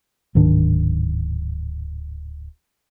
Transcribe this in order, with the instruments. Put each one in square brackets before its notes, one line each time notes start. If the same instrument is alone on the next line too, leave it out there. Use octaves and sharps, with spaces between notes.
[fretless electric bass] D1 G#2 D#3 D4